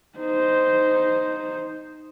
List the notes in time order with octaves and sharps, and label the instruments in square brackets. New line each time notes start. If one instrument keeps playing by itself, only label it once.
[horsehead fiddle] D#4 C5